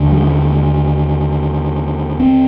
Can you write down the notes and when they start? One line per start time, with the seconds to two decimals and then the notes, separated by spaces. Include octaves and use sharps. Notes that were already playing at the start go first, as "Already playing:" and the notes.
Already playing: D#2 D3
0.12 G3
0.18 G#3
2.20 C4